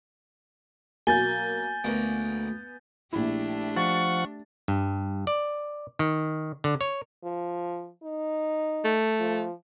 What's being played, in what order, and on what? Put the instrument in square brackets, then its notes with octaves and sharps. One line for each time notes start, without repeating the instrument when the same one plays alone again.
[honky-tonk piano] B2 F#3 A#3 [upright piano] G#5 [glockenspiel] G6 A6 G7
[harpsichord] D2 A#3 [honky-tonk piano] B3
[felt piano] A#1 E4 [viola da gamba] A3 D4 G4
[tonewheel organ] F3 F#5 [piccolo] C#6 [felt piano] A6
[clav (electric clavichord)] G2
D5
D#3
D3
C#5
[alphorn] F3
D#4
[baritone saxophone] A3
[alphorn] F3